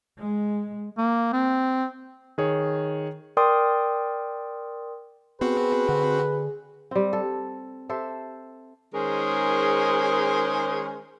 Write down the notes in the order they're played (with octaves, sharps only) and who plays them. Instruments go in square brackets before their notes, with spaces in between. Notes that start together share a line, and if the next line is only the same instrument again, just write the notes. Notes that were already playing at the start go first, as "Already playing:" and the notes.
[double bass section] G#3
[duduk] A#3
C4
[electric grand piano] D#3 G#4 C#5
[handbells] A#4 D5 G5 C6 D#6
[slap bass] B3 [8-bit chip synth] C4 F#4 [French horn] G#4 [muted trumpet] B4
[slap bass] D3
[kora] G3 C4
A4
G4 A4 C5 E5
[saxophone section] D#3 G#3 C#4 G#4 A#4 C5